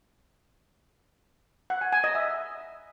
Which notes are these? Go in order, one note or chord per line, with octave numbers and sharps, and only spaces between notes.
F#5
G#5
G#5
D#5
E5